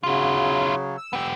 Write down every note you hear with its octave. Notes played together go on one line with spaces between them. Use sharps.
C#3 F#3 E4 F4
E6
B3 G4